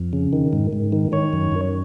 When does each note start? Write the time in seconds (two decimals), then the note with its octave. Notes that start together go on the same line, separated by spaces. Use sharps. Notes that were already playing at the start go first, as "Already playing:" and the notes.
Already playing: F2
0.13 C#3
0.33 D#3
0.53 G#2
0.73 G#2
0.92 D#3
1.12 D#3 C#5
1.33 F#2
1.52 F#2